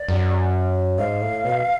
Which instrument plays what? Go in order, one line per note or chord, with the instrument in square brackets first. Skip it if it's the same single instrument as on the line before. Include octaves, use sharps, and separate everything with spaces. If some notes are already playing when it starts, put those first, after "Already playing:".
Already playing: [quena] D5
[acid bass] F#2
[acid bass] G#2 [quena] F5
[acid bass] A2
B2